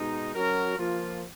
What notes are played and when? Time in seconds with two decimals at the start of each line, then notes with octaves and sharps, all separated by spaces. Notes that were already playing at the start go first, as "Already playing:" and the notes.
Already playing: B2 G#3 D#4
0.34 F#3 C#4 F#4 A#4
0.78 F3 A#3 F4